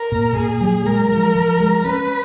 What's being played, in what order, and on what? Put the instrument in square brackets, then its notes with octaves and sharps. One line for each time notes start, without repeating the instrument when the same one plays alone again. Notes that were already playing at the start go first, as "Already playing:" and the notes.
Already playing: [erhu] A#4
[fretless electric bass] A#2
[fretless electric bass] A#2 [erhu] G#4
[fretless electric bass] F#3
[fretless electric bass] G#3 [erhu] A#4
[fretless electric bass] F3
F3
G#3
[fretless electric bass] C#4 [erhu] B4